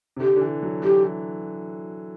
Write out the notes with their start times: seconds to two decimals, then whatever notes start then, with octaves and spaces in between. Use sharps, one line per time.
0.16 C3
0.20 D3 G4
0.36 D3
0.41 E3
0.63 F#3
0.84 F#3 G4
1.05 E3